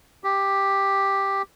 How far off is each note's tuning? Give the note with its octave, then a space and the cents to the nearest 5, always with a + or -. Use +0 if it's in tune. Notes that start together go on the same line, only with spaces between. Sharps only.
G4 +5